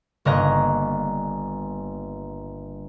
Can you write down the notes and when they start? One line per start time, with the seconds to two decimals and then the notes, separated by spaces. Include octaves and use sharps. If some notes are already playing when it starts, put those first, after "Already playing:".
0.25 G1 A#3 C#5 D#5 A#5 F#6